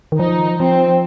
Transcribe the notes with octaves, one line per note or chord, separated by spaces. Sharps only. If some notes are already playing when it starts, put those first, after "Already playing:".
D#3
F3 D#4
F3 C4